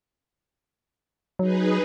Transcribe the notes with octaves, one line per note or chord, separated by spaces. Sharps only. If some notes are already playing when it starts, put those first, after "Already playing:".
F#3 D#4 G#4 B4